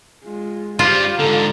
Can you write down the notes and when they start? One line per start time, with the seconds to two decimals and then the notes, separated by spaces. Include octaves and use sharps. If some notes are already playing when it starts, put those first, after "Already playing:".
0.24 G#3 F4
0.79 G2 G3 F4 G4 C5
1.19 G#2 D3 A4 A#5